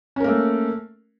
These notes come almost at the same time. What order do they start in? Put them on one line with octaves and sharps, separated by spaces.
C#4 A#4 A#3 A3